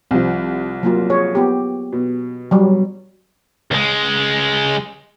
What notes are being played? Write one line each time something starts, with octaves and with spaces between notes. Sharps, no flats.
C2 F3
F#3 A#3 F4
G#4 C#5
B3 G4
B2
F#3 G3
C#2 G#3